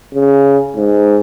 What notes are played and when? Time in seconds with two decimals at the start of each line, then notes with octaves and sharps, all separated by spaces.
0.15 C#3
0.77 G#2